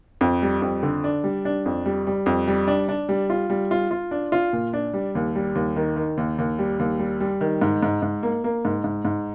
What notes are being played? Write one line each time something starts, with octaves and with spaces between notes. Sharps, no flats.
F2
G3
F2
D3
D4
G3
D4
F2
G3
G3
F2
G3
D4
D4
G3
F4
G3
F4
F4
D4
F4
A#2
D4
G3
D#2
G3
D#2
D#3
D#3
D#2
D#2
G3
D#2
G3
G3
D#3
G#2
G#2
G#2
A#3
A#3
G#2
G#2
G#2